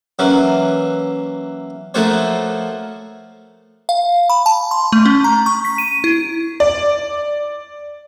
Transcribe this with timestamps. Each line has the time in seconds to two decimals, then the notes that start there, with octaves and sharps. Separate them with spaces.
0.19 E3 F#3 A#3 C#4
1.94 F3 A3 A#3 F#4 C5 C#5
3.89 F5
4.30 B5
4.46 A5
4.71 C6
4.92 A3
5.05 C#4
5.24 A#5
5.46 C#6
5.65 B6
5.78 D#7
6.04 E4
6.60 D5